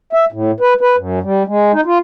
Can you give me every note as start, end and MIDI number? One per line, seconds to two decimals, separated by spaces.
0.13 0.25 76
0.32 0.51 45
0.60 0.74 71
0.81 0.96 71
0.96 1.19 42
1.23 1.43 55
1.47 1.72 56
1.72 1.81 63
1.85 1.98 65